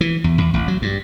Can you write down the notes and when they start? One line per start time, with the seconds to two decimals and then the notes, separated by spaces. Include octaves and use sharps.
0.01 E3
0.24 E2
0.38 E2
0.54 A1
0.68 F#3
0.82 G2